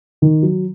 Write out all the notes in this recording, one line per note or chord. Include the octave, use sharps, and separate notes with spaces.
D#3
F#3